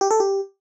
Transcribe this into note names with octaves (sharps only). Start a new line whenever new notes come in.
G4
A4
G4